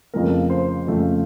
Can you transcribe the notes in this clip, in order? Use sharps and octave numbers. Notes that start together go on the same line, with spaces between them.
F2 C#3 F3 A3 A#4
C5
F2 C#3 F3 A3